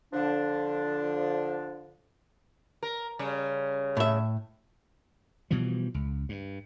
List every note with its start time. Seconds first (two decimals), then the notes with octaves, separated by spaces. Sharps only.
0.13 D3 F3 D4
2.83 A#4
3.19 C#3 G3
3.97 A2 E5
5.51 B2 E3 F3 G3
5.94 C#2
6.29 G2